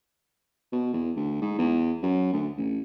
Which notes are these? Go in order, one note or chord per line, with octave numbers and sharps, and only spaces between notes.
B2
E2
D2
G#2
E2
F#2
D2
A1